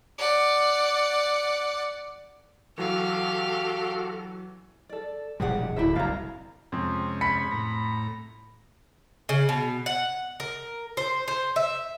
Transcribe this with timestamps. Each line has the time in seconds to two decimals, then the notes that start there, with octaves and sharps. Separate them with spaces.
0.18 D5 F#5
2.78 E3 F#3 F#4 G4 A4 F5
4.89 A4 D5
5.40 E1 A#1 G3 G4 G#4 F#5
5.76 D1 E4 G4 E5
5.96 F#1 C2 F#2 F5 A#5
6.72 F2 C3 G#3 C#4
7.21 B5 B6 C#7
7.51 A2 A#5
9.29 C#3
9.49 B2
9.86 F#5
10.40 A#4
10.97 C5
11.28 C5
11.56 E5